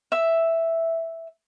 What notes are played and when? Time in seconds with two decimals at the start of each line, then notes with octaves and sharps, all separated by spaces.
0.12 E5 E6